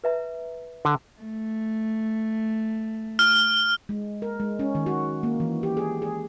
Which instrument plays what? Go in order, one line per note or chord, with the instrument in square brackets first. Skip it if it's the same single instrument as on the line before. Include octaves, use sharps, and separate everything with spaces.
[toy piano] B4 E5 A#5
[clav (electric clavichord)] D3
[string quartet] A3
[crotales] F6
[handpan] G#3
A#4
G#3
C#4
D#3
F#4
A#3
E3
G4
G#4
G#4